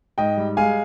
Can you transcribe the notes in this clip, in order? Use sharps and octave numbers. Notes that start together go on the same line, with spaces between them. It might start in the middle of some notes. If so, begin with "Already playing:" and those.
G#2 D#5 G5
G3
G#3 F5 G#5